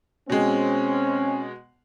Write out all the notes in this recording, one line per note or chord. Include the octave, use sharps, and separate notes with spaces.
B2 G#3 C4 C#4